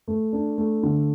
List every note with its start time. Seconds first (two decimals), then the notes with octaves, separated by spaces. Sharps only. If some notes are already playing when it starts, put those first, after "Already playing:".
0.08 A3
0.33 D4
0.58 A3
0.83 D3